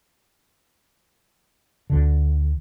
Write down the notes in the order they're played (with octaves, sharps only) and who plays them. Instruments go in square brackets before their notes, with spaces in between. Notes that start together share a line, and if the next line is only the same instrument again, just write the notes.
[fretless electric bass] D2 D3